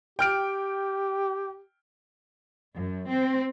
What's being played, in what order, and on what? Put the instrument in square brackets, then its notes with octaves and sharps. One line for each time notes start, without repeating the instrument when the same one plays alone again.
[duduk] G4 [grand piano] G5 F6 D7
[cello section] F#2
C4